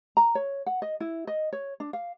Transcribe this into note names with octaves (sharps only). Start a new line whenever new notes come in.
A#5
C#5
F#5
D#5
E4
D#5
C#5
D4
F5